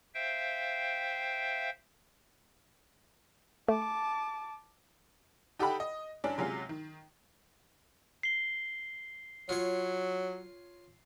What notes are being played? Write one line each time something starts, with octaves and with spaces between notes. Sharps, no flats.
C5 E5 F5 G5
A3 A5 D6
D#4 G4 A4 F#5 G5 B5
D#5
G2 C#4 D4
C3 F#3 G#3 C#4 F4
D#3
C7 G7
F#3 F4 C#5